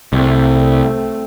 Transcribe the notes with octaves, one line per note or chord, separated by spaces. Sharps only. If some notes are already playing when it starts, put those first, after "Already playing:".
C2 A3 C4